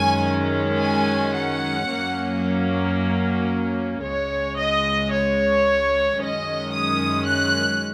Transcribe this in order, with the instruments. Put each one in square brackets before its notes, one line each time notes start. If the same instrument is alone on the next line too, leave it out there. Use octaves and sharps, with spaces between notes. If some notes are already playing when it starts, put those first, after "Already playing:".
Already playing: [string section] F#2 D#3 G#3 C#4 G#5
G#5
F#5
F#2 F#3 A#3 C#4
C#2 C#3 G#3 C#5
D#5
C#5
F#2 D#3 G#3 C#4 D#5
D#6
F#6